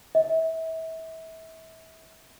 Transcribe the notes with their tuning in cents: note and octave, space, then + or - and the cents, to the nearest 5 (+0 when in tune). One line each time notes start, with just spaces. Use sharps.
E5 -30